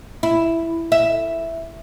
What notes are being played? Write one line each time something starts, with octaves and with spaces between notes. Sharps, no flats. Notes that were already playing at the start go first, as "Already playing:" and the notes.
E4
E5